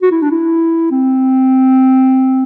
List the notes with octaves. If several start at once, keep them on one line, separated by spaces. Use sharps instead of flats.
F#4
E4
D4
E4
C4